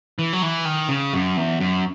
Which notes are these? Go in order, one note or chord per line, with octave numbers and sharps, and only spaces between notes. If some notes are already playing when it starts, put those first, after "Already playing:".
E3
F#3
E3
D#3
C#3
F#2
E2
F#2